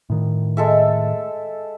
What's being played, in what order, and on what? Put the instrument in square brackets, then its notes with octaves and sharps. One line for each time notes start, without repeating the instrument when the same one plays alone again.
[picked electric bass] A2 D#3
[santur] G#3 A4 E5